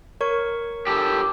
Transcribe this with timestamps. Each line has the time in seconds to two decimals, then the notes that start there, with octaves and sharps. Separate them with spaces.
0.21 A#4 C#5 C#6
0.87 G4 A4